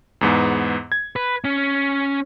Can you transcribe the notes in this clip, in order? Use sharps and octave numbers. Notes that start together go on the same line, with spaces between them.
E2 G#2 B3
G#6
B4
C#4